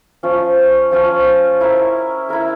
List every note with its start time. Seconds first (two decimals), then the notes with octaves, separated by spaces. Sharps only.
0.23 F3 C#4 F4
0.91 F3 C#4 F4
1.61 E4 A#4 E5
2.29 E4 A#4 E5